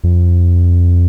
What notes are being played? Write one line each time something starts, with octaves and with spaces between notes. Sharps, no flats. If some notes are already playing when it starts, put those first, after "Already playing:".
F2